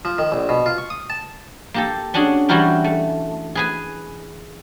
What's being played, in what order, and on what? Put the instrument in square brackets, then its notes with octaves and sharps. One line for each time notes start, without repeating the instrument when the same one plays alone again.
[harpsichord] F3
D#3
A#1
B2
F4
C#6
D#6
A5
[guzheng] A#3 G4 A4
C#4 D4 F#4 G#4
E3 G3 E4 F#4 A#4 G5
A3
G#4 B4 G#5